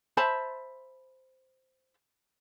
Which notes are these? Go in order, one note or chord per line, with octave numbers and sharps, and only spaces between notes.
C5 E5 A5 B5